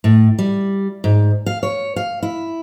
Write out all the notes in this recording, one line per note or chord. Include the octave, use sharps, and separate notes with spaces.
A2
G3
G#2
F5
C#5
F5
E4